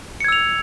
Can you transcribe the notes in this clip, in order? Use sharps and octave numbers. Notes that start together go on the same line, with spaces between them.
E6 G#6 C#7 F7